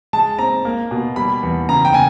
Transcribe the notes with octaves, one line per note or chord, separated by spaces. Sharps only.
G#3 A5
C4 A#5
A#3
B2
G3 B5
E2
C#3 A#5
G5
C#3 G#5